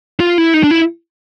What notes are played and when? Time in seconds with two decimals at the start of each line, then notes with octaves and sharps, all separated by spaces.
0.20 F4
0.38 E4
0.54 D#4
0.64 D4
0.71 E4